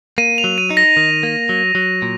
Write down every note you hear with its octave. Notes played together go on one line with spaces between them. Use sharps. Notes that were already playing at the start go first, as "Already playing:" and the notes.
A#3 D#7
F7
F#3
D#7
D#4
A#6
D#3
A#3
F#3
F#3
A#2